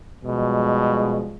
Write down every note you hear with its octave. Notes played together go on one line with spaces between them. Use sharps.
B2 F3 G3 G#3